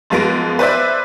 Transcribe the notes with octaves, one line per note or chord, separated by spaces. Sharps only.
F#2 F3 G#3 B3 A#6 D7
B4 C5 D5 E5